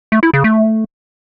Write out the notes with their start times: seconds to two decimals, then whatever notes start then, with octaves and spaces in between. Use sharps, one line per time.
0.12 A3
0.23 E4
0.33 C#3
0.44 A3